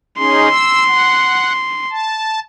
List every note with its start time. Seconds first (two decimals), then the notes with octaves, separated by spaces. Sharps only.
0.18 C#4 D#4 G#4 C6
0.51 E6
0.88 F#5
1.90 A5